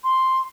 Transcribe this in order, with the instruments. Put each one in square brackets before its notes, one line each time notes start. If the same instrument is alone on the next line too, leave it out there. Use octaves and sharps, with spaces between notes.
[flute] C6